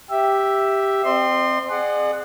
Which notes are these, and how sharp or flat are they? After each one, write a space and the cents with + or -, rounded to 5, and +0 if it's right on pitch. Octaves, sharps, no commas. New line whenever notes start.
G4 +0 E5 +0
C4 +0 D#5 -45 C6 +0
G#4 +0 D5 +45 F#5 +0